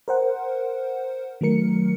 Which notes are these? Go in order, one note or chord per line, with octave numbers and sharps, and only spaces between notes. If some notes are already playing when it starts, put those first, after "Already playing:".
A#4 C5 F#5
D#3 F#3 A3 A#4 C#7